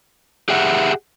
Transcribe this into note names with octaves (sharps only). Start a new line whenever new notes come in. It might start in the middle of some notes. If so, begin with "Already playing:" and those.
G4 G#4 E5 F#5